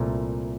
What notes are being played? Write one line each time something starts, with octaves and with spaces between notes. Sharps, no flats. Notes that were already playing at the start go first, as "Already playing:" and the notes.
Already playing: C2 A#2 A3